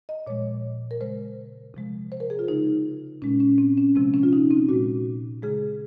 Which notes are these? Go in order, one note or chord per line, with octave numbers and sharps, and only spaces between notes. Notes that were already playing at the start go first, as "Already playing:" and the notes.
D#5
A#2 F3 G#3 C#5
A#4
C#3 G#3 C5
C3 F3 G#3
C5
A#4
G#4
F4
C#3 G#3 D#4
A#2 G#3 C#4
C#4
C4
C#4
C3 F3 G#3 C4
C#4
F4
D#4
C4
A#2 G#3 F#4
C#3 G#3 G#4